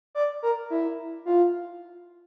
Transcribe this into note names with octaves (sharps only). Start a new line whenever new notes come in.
D5
A#4
E4
F4